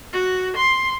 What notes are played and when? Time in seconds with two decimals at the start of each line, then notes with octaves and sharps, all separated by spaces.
0.13 F#4
0.56 C6